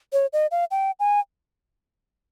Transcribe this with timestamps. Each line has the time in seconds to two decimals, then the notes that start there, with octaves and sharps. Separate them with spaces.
0.13 C#5
0.33 D#5
0.51 F5
0.71 G5
1.00 G#5